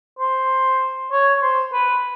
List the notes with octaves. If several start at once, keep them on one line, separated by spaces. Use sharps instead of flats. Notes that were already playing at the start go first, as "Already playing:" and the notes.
C5
C#5
C5
B4